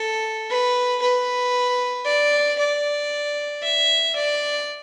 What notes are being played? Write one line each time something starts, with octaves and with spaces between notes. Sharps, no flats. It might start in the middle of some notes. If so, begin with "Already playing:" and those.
Already playing: A4
B4
B4
D5
D5
E5
D5